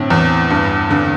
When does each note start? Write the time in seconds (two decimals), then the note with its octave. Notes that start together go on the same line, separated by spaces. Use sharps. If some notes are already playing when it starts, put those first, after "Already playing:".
Already playing: A2 D3 C4
0.10 E2
0.50 G2
0.91 D3